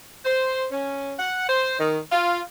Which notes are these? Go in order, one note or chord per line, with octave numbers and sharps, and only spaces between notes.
C5
C#4
F#5
C5
D#3
F4